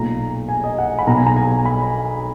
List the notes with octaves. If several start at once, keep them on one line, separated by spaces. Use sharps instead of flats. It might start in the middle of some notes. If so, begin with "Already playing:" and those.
Already playing: B1 A#2 A#5
G#5
D#5
F#5
B5
B1 B2 A#5
G#5
A#5
G#5
B5